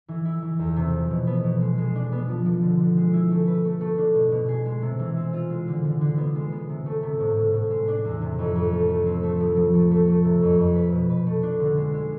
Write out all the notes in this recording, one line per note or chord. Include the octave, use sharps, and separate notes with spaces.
E3
E4
E3
E2
C3
F3
B2
B3
B2
G#3
G#3
D4
B3
F3
F3
D3
D3
G#3
E4
A3
B4
A3
A3
D4
B2
B2
G#4
G#3
C3
E3
C4
F4
G#3
D3
D3
D3
B3
G#3
B3
C3
A3
C3
A2
A2
A2
G#3
D4
E2
C3
F2
F2
A3
A3
C4
A3
F3
F3
A3
A3
A3
C3
F2
F2
B4
B2
B4
A3
D4
D3
G#3
G#3